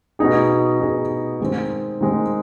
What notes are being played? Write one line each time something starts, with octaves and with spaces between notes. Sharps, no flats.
B2 B3 D#4 G#4
B2 B3 D#4 G#4
D#3 G#3 C4
D#3 G#3 C4